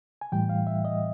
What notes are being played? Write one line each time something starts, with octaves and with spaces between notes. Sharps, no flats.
G#5
A2 E3 G3 G5
F5
E5
D#5